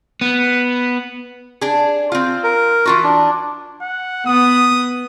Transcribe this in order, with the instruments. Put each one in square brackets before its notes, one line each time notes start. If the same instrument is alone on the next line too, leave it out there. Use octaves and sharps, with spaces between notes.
[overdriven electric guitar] B3
[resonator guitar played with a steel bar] D4 G#4
C4 F4
[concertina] A#4
[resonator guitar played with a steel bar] E3 F4 F#4
[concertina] D4
[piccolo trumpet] F#5
[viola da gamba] B3 [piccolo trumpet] D#6